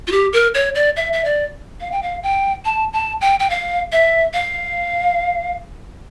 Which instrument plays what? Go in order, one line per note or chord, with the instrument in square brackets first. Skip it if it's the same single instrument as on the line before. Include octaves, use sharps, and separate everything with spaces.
[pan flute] F4
G4
A#4
C#5
D5
E5
E5
D5
F5
G5
F5
G5
A5
A5
G5
G5
F5
E5
F5